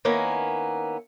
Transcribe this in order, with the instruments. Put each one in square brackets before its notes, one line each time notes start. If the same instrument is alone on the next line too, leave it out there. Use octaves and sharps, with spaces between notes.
[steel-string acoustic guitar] D#3 A#3 B3 C#4 E4